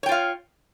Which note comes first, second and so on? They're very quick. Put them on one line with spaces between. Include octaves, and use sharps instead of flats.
C#5 G5 F4 F5